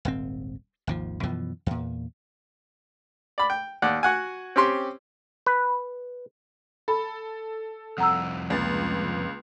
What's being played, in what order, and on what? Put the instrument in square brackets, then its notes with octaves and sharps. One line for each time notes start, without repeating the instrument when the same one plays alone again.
[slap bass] D#1 G#1 C4
G#1 D#2 F3
F#2 B2 E3 F3
E2 A#2
[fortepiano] D5 B5
G5
D#2 D5 F#5
F#4 F#5 G#5
C4 C#4 G4 C6
[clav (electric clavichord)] B4
[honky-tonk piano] A4 [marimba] B5
[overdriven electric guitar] C2 F2 [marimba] F#5 A#5 E6
[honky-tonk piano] C#2 A6 [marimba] G#3 A#3